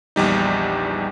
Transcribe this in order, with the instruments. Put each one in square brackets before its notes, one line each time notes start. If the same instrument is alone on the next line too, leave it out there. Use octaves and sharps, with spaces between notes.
[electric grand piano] A#1 E2 G3 D#4